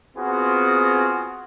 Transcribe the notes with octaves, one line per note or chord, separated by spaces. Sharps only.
B3 C4 F4 F#4 G#4